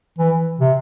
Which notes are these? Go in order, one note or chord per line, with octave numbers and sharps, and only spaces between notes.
E3
C3